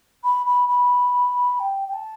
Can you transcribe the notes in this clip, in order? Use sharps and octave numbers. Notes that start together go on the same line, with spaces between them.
B5
B5
B5
G5
G5
A5